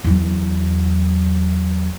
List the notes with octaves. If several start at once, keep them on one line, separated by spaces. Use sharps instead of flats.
E2 F#3